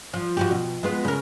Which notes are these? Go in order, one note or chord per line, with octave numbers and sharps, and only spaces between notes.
F3
F3 F#4 G4
B2
G#3 B3 F4
C#3 A#4